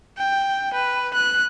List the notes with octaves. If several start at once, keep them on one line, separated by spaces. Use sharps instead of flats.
G5
B4
F#6